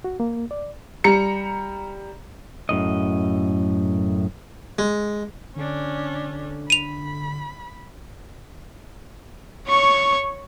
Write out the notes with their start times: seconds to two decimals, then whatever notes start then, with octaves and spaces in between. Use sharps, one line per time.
0.04 F#4
0.20 A#3
0.51 D5
1.04 G3 A#5 C#7
2.69 F#2 A2 D#5
4.79 G#3
5.56 D3 C#4 D4
6.70 B5 D#7 F7
9.69 C#5 C#6